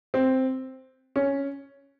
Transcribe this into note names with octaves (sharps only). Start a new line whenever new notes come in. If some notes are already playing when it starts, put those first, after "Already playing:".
C4
C#4